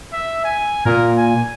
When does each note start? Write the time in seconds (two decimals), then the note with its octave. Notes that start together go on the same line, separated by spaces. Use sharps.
0.13 E5
0.45 G#5
0.86 A#2 A#4
1.17 G#5